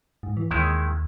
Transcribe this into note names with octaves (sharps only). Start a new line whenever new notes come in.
G#2
E3
D#2 D#3 G#3 E4